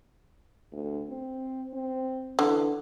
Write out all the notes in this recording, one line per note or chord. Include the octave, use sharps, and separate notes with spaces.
D2
C4
C4
D3 E3